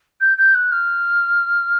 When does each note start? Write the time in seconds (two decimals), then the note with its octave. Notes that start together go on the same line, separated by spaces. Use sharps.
0.20 G6
0.37 G6
0.54 F#6
0.71 F6